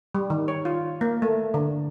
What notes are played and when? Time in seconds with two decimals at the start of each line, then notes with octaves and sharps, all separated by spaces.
0.15 G3
0.30 D#3
0.48 C#5
0.65 F4
1.01 A#3
1.22 A3
1.54 D3